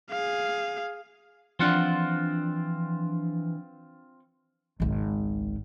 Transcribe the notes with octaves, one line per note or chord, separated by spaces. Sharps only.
G#4 F5
E3 F3 C4 D4 F4 F#5
G#1 C#2